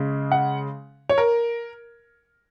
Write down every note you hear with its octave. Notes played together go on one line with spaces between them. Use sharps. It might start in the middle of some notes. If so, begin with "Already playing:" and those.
Already playing: C#3 G#3
F#5
C#5
A#4